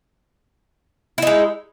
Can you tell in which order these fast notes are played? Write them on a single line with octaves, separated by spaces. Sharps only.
E4 D#4 G#3